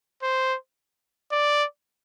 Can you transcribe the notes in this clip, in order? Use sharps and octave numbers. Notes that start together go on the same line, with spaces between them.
C5
D5